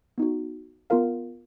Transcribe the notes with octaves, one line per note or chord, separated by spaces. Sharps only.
B3 D#4 F#4
B3 F4 A#4 F5